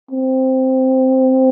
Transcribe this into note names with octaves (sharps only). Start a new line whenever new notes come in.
C4